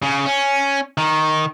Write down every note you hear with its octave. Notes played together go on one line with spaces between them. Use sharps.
C#3
C#4
D#3